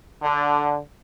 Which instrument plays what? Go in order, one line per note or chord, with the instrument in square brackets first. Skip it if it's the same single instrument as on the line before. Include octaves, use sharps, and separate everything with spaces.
[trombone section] D3